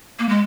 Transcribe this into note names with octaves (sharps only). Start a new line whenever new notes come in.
A#3
G#3